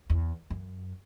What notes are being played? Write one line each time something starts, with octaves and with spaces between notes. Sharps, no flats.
E2
F#2